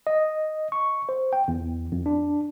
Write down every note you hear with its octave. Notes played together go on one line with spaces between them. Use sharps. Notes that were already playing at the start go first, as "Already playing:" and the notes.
D#5
C#6
C5
G5
E2
F2
D4